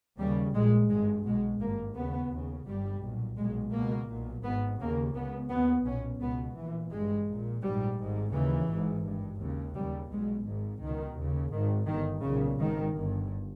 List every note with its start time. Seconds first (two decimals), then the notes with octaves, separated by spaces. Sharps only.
0.18 D#2 C#3 G3
0.54 A#1 A#2 G#3
0.89 G#1 G2 G#3
1.25 B1 B2 G#3
1.60 G#1 G2 A#3
1.96 D#2 C#3 B3
2.31 D#2 C#3
2.66 G1 G2 G3
3.01 B1 A#2
3.37 B1 A#2 G#3
3.73 C#2 B2 A#3
4.08 B1 A#2
4.43 G#1 G#2 B3
4.79 D#2 C#3 A#3
5.14 C#2 C#3 B3
5.49 D#2 C#3 B3
5.85 B1 A#2 C#4
6.21 C#2 B2 B3
6.56 A#1 A#2 E3
6.91 G#1 G2 G#3
7.27 A#1 A#2
7.62 A#1 G#2 G3
7.98 G#1 G#2
8.33 D#2 C#3 E3
8.68 G#1 G#2
9.04 G#1 G2
9.40 D#2 C#3
9.75 D#2 C#3 G3
10.10 B1 B2 G#3
10.46 G#1 G#2
10.81 C#2 B2 D#3
11.16 D#2 C#3
11.51 G#1 G#2 D#3
11.87 G1 G2 D#3
12.22 B1 A#2 C#3
12.58 G#1 G#2 D#3
12.93 G1 G2